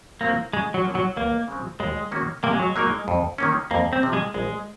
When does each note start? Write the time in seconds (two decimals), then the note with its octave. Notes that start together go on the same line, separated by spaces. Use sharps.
0.21 F#3 A#3 C4 F#4 A#4
0.53 C#3 G#3
0.74 F#3
0.84 F3 A#3 C#4 G#4
0.95 F#3
1.17 C#2 A#3
1.48 C#3 G#3 C4
1.80 D#2 G#3
2.11 D#3 A#3 C#4 F#4
2.43 C3 A#3
2.51 G#3
2.59 F#3
2.66 G#3
2.76 F#3 A#3 D#4 A#4
3.08 F2
3.38 D#3 A#3 C#4
3.71 F2 A#3
3.93 C4
4.03 C3 F3
4.13 G#3
4.34 A#1 G#3